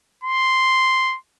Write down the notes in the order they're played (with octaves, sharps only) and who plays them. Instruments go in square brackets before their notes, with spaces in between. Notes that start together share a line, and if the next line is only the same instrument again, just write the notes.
[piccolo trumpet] C6